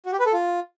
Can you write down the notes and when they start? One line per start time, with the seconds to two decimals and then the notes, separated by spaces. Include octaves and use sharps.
0.06 F#4
0.13 G4
0.19 B4
0.26 A4
0.33 F4